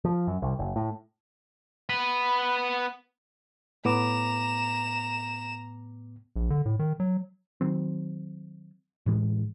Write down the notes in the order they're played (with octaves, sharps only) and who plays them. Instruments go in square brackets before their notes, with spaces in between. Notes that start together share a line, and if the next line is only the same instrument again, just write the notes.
[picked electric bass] F3
F#2
C2
F#1
A2
[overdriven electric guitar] B3 B5
[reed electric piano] A2 B3 D6 [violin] A#5 E7
[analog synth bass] A#1
D3
A2
D#3
F#3
[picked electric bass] D#3 F#3 C4
A2 E3 G#3